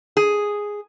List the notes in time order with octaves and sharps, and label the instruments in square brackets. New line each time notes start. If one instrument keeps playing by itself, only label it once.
[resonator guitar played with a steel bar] G#4